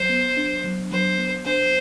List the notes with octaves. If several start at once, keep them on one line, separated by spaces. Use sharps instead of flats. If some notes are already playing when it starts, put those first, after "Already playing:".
Already playing: F#3 C5
B3
D4
F#3
F#3 C5
B3
D4 C5